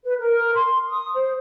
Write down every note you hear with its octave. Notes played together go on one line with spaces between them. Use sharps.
B4
A#4
C6
D#6
C5